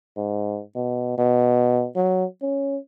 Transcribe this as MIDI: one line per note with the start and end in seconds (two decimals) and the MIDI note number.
0.17 0.60 44
0.76 1.17 47
1.18 1.87 47
1.96 2.25 54
2.42 2.77 61